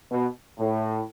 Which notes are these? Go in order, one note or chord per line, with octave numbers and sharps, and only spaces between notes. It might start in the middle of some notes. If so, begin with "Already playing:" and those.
B2
A2